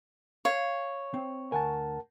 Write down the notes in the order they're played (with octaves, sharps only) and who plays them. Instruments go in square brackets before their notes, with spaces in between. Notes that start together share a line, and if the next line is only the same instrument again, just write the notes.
[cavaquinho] C#5 [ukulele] F5
[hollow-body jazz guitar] C4
[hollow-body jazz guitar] D2 G#5 [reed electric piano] A#4 F#5 A5